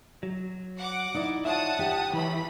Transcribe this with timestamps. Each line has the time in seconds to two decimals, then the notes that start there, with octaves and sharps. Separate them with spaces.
0.23 F#3
0.78 F#5 D6
1.14 D#4 E4 D5
1.45 F4 C#5 E5 F#5 A5 D#6
1.79 G4
2.13 B1 E3 E4 B5